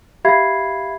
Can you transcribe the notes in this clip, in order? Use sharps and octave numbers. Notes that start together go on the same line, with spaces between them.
G4 E5 F5 B5 G#6 C7